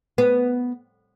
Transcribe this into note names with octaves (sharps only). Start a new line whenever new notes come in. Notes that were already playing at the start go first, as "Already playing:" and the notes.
B3